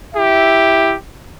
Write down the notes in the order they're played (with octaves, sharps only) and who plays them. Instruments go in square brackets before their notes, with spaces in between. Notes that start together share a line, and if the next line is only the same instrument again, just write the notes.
[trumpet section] E4 G4 E5